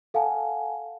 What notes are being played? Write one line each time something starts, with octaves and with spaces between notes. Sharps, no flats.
A4 F5 F#5 G#5 A5